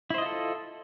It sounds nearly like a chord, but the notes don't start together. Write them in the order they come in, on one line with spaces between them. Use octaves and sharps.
E4 C5 D#5 F4 A4